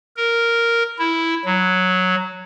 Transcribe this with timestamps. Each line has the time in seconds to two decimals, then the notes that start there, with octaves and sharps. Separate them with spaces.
0.16 A#4
0.99 E4
1.45 F#3